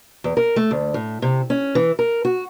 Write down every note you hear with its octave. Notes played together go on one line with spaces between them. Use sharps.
E2
A#4
A3
D2
A2
C3
C#4
E3
A#4
F#4